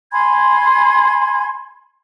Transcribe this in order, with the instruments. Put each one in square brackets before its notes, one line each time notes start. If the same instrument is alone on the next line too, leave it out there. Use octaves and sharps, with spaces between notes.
[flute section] G#5 B5 C6 G#6